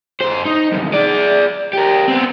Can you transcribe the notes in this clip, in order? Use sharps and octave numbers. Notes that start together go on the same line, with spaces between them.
F#2 C5
D#4
C2 F#2
G#4 D5
G4 A#4
B3 C4